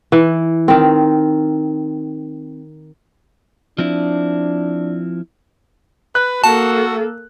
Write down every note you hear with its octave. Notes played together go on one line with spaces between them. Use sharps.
E3
D#3 C4
F3 C4 D4 E4
B4 F#6
A#3 F#4 A4 A5